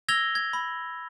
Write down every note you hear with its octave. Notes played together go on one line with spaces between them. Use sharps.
E6 G#6 A#6 F7 G7
G#6
B5